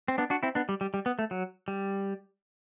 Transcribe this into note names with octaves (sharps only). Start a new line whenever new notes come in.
C4
B3 D4
D4 F#4
C4 E4
B3 D4
G3
G3
G3
B3
A3
F#3
G3